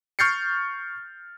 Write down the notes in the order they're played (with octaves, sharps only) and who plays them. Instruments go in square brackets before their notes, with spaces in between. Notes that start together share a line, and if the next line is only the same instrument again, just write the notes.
[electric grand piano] C#6 F6 G6 A6 C7 C#7